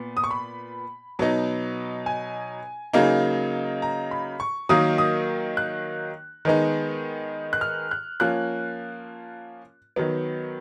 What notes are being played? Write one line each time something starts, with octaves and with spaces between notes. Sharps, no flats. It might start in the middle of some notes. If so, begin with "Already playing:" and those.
Already playing: A#2 B3
D#6
C#6
B5
B2 F#3 B3 D#4
G#5
C#3 F#3 A#3 D#4
A#5
B5
C#6
D#3 F#3 A#3 D#4 D#6
D#6
F#6
D#3 G#3 B3 D#4
F#6
F6
F#6
F3 A#3 C#4 F#6
D#3 F#3 B3